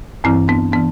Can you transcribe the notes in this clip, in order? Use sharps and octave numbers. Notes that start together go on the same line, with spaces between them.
G2 E3 C4 E4
B3 D4
E3 B3 D4